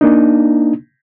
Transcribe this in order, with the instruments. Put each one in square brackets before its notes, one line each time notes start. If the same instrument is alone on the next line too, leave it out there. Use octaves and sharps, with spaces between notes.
[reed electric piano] A#3 D4 D#4